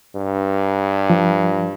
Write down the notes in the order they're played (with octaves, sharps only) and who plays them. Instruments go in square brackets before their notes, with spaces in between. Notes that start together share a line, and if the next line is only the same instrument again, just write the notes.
[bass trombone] G2
[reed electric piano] F3